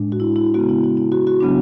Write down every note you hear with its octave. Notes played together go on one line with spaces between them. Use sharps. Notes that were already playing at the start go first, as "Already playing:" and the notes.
Already playing: A2 G#3 D4
F#4
E4
E4
C#3 G#3 B3 F#4
E4
E4
E4
F#4
F#4
C#3 F#3 B3 D4